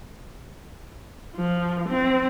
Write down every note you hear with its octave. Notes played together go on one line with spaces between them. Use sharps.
F3
C4